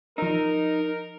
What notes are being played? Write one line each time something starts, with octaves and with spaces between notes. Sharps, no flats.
F3 D#4 A#4 E6